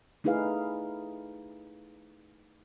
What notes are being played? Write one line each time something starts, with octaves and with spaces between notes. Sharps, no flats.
A3 D#4 E4 G#4 B4 F5